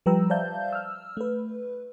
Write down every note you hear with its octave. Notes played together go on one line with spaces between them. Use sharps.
F3 G3 B4 G5 A#5 E6
C5 D5 E5 F5 A5 G6
E6 F6
A3 B4